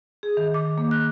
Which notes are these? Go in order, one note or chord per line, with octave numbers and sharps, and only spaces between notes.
G#4
D#3
D6
A#3
F#6